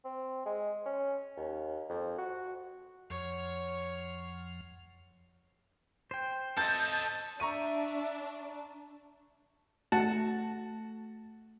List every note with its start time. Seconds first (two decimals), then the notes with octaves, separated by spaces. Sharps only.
0.05 C4
0.46 G#3
0.86 C#4
1.37 D#2
1.89 F2
2.18 F#4
3.10 F2 F3 C#5 F#5
6.11 C5 G5
6.57 A4 D#5 A5 G6
7.40 D4 E5 A#5 C#6 D#7
9.92 A3 F#4 A5